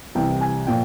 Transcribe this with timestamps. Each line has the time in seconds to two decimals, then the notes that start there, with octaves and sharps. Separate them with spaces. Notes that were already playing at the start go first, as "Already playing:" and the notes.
0.15 C2 C3 E3 G5
0.41 G#5
0.67 A#2 F3 G5